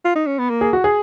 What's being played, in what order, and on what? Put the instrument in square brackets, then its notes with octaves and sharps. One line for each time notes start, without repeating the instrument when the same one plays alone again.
[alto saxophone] F4
D#4
C#4
B3
A#3
[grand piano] G#4
F#4
G#4